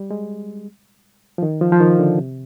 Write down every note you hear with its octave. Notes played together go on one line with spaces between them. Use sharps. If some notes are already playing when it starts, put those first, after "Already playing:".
Already playing: G3
G#3
F3
D#3
F3
F3
D#3
D3
C3